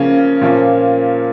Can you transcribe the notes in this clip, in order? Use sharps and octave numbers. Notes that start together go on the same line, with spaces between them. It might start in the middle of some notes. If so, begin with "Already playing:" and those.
Already playing: C#3 F3 A#3 C#4
A#2 F3 A#3 C#4